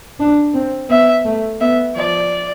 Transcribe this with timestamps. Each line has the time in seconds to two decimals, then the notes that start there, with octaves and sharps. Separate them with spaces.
0.20 D4
0.54 C4
0.90 B3 E5
1.25 A3
1.60 B3 E5
1.96 F3 D5